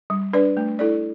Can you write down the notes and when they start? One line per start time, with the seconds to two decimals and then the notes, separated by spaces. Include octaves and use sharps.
0.10 G3
0.33 D4 B4 D5
0.57 A3
0.79 E4 A4 D5